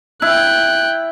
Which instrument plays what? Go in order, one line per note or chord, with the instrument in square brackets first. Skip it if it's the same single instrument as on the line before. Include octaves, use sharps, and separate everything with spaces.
[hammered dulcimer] E4 [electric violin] G5 F#6